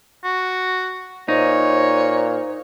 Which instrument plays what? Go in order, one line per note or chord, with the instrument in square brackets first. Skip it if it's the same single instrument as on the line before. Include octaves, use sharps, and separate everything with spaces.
[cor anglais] F#4
[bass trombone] A#2 [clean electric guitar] D#4 [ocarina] C5 [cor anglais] C#5